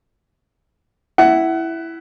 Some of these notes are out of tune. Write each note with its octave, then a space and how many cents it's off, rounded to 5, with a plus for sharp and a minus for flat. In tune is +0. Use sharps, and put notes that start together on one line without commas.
E4 +0 F#5 +20